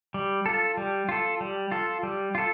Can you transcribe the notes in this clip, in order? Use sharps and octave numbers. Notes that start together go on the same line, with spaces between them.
G3
F4 A4
G3
F4 A4
G3
F4 A4
G3
F4 A4